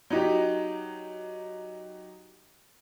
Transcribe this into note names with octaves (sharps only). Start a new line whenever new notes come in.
F#3 D#4 G4